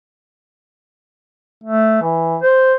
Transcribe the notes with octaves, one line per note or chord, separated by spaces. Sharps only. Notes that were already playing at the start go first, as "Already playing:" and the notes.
A3
E3
C5